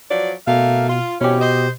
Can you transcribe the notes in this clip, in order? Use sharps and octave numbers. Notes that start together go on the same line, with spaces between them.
F3 F#3 D5
B2 A3 A#3 F5
F4
B2 E3 C4 C#4 G4
C5 D#5